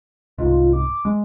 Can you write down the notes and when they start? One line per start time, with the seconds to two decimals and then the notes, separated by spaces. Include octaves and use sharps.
0.38 C2 G#2 F4
0.73 D6
1.05 G#3